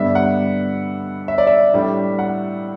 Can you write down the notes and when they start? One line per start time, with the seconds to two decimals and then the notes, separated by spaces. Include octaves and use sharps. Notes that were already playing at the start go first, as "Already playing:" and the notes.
Already playing: G2 D3 G3 B3 D4 E5
0.15 F#5
1.28 E5
1.38 D5
1.47 E5
1.74 A2 G3 D4
2.19 F#5